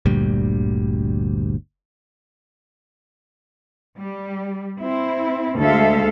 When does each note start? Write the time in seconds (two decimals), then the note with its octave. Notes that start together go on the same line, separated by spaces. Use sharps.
0.05 G1 D2 A#2 G3
3.98 G3
4.81 C4 E4
5.59 D2 G#3 A4 E5 F5